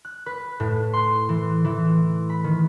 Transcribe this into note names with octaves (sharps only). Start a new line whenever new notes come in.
F#6
B4
A2
C6
E3
E3
B5
D#3